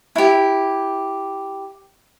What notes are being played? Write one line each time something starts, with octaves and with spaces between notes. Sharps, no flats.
E4 G4